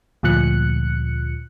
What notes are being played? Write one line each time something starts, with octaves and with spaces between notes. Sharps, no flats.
D2 A#2 F3 F#6 C#7